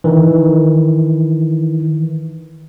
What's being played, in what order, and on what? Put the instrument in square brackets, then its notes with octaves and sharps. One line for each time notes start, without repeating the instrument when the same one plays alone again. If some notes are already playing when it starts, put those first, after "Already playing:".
[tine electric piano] D#3 E3